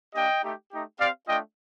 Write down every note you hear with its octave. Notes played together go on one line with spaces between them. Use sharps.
A#3 D4 G4 D#5 G5
A3 D#4 G4
A3 D#4 G4
C4 G4 D5 F5
A3 D4 F4 D#5 G5